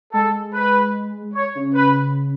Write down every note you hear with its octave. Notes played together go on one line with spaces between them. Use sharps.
G#3 A4
B4
C#5
C#3
B4